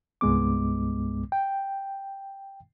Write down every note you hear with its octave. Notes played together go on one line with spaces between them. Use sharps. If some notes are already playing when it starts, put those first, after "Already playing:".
C2 G2 G#3 B3 D6
G5